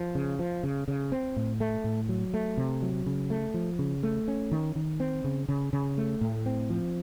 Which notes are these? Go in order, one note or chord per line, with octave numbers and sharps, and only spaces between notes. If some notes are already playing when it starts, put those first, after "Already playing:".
Already playing: F3
C#3
F3
C#3
C#3
C4
A2
A3
A2
F#3
A3
C3
F#3
C#3
A3
F3
C#3
A3
C#4
D#3
D#3
C4
C#3
C#3
C#3
A3
A2
C4
F3